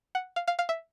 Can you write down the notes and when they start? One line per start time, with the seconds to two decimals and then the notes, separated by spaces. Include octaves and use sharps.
0.15 F#5
0.36 F5
0.48 F5
0.59 F5
0.69 E5